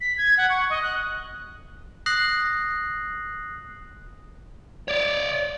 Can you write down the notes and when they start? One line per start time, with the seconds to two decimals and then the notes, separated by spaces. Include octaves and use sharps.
0.01 B6
0.18 G#6
0.37 F#5
0.50 C#6
0.70 D#5
0.82 F#6
2.06 D#6 F#6 A#6 C7 F#7
4.88 C#5 D5